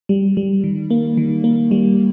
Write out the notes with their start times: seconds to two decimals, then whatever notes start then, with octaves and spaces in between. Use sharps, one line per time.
0.09 G3
0.37 G3
0.64 D#3
0.90 A#3
1.17 D#3
1.44 A#3
1.71 G3